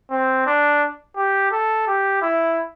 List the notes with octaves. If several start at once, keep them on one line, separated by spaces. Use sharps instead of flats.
C4
D4
G4
A4
G4
E4